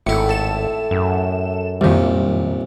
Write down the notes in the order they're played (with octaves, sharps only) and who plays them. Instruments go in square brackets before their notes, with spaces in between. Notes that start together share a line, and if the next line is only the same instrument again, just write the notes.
[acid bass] G#1 [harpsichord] A2 E4 [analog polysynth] C#7
[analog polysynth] A4 E7
[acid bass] F#2
[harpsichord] C2 A#2 [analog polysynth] F2 D#3 G3